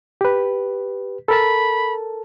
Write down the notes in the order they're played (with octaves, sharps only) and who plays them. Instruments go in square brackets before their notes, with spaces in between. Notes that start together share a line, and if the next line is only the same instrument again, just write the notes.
[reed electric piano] G4 B4
[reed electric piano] A4 A#4 A5 [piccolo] B5